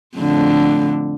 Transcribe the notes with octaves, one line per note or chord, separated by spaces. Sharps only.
F2 A2 D3